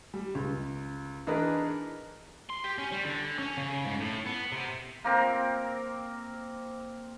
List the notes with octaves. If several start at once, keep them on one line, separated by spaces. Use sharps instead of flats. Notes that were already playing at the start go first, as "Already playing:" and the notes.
G3
C#2
E3 D4 D#4 G#4 A#4 B4
C6
G4
C#4
G3
D3
C#4
C#3
G#2
A2
B3
C3
A#3 C4 A#4